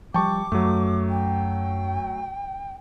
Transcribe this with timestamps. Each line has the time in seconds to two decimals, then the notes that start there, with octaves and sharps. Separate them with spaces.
0.14 F3 G3 G5 A5 C#6 D6
0.52 F#2 F#3 A3
1.10 G5